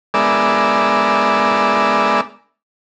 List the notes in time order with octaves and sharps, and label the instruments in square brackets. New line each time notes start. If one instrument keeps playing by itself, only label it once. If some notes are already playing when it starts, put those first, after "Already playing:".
[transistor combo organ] G#3 B3 D4 A#4 D5 E5